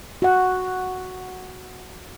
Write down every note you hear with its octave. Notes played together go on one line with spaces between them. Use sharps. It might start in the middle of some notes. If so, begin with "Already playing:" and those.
F#4 F#5